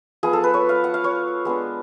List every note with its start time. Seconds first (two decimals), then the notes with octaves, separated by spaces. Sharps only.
0.23 F3 B3 F4 G#4
0.33 A4
0.44 B4
0.54 C#5
0.69 F5
0.84 F#5
0.94 F5
1.04 C#5
1.45 G#3 B3 D4